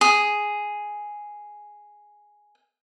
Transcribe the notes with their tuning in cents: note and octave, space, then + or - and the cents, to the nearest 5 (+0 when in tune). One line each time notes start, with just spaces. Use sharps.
G#4 +0 D#6 +0